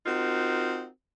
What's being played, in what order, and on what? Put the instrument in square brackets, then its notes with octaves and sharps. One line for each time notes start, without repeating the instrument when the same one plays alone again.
[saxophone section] C4 D#4 F4 F#4 A#4